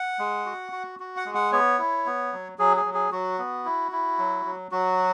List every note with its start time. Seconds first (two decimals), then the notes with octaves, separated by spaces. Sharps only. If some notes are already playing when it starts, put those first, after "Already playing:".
Already playing: F#5
0.19 G#3
0.46 F#4
0.72 F#4
1.00 F#4
1.17 F#5
1.25 G#3
1.35 F#5
1.52 B3 C#5
1.79 E4
2.06 B3
2.32 F#3
2.58 F#3 G#4
2.77 G#4
2.85 F#3
2.94 G#4
3.12 F#3 F#4
3.38 B3
3.65 E4
3.92 E4
4.18 F#3
4.45 F#3
4.72 F#3 F#4